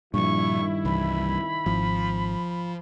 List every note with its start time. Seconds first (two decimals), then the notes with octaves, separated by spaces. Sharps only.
0.14 G2 A#2 D#3 F3 E4 C#6
0.85 C2 E3 B5
1.66 G#1 F3